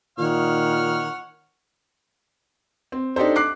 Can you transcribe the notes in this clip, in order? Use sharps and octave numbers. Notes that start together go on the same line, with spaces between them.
A#2 D#3 C#5 F#5 F6
C4
D4 D#4 G4 A4 C5
D6 F#6 C7